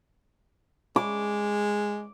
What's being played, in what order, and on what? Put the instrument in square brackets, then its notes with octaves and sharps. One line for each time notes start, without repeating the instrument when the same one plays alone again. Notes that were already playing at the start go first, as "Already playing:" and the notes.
[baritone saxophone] G#3 [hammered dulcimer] D6